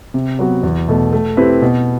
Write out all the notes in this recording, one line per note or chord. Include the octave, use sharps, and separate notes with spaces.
C3
F#3 B3 F#4
E2
B2 A3
A3
C4 E4 G4 B4
B2